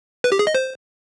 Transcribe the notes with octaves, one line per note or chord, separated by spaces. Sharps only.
B4
G4
G#4
D#5
C5